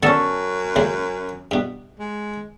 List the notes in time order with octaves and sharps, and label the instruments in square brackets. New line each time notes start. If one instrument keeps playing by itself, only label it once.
[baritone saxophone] F#2 [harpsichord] D3 B3 [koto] C#4 A4
[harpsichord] C#2 C#3 A#3
G2 B2
[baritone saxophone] G#3